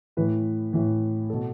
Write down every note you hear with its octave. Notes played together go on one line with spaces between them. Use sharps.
A2 E3 B4
A2 E3
B2 A4